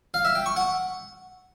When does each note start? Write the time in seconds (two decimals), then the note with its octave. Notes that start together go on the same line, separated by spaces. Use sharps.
0.14 F5
0.25 E5
0.35 G5
0.46 C#6
0.56 F#5